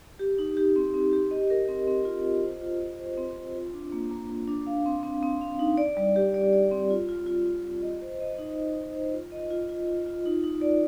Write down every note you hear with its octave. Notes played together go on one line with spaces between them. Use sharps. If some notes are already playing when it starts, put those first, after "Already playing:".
G4
D#4
G4
C4
C4
G4
D#5
A#4
C4
C4
F4
D#5
C5
F4
F4
C5
C4
C4
F4
D4
A#3
A#3
A#3
D4
F5
C4
C4
C4
F5
D#4
D5
G3
G4
D5
D5
C4
F4
F4
F4
F4
F4
D#5
C5
D#5
D#4
D#5
C5
C5
F4
D#5
F4
F4
F4
F4
D#4
D#4
D5